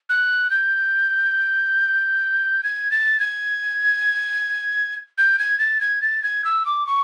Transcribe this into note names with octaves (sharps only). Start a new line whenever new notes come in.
F#6
G6
G#6
A6
G#6
G6
G#6
A6
G#6
A6
G#6
E6
D6
C#6